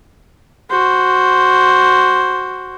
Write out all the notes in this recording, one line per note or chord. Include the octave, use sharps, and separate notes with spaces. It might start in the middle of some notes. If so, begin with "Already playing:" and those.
F#4 C5